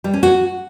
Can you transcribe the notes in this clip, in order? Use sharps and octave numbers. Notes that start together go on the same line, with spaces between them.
G3
C#4
F#4